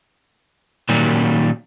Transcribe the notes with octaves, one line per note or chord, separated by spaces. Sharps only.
A#2 D#3 F#3 G3 A#3